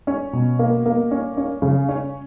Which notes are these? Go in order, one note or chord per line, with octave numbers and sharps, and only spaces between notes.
C#4
B2
A#3
A#3
C#4
C#4
C#3
C#4